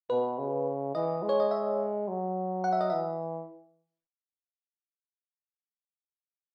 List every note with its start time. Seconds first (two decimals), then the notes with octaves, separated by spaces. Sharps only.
0.10 B2 B4
0.38 C#3
0.95 E3 D#5
1.23 G#3
1.29 C#5
1.40 D#5
1.51 E5
2.08 F#3
2.64 F#5
2.73 E5
2.81 D#5
2.90 E3 E5